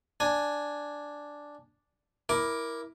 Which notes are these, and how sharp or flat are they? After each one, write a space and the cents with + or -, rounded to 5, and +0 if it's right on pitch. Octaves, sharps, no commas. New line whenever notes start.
D4 +0 G#5 +0
E4 -5 A#4 +10 D6 +0